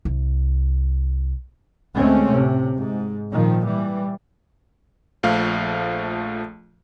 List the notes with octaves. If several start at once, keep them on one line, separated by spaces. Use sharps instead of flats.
C2
D2 G#3 A3 C4 C#4
A2 C3
G#2
A#2 D#3 F3
E3 G3
A#1 F3 A3 F5